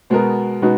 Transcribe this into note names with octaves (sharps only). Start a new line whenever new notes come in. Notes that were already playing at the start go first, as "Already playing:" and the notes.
B2 G#3 B3 F#4 A#4
B2 G#3 D#4 F#4 B4